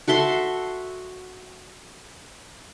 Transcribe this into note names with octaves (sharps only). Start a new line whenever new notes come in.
F#4 A4 E5 C6